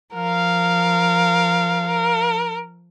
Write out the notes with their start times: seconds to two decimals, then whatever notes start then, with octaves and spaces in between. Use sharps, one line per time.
0.14 F3 A#4 F5
1.87 A#4